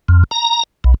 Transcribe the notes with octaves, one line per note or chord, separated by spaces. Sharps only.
F2
A#5
B1